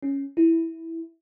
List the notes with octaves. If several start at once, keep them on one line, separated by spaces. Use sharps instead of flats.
C#4
E4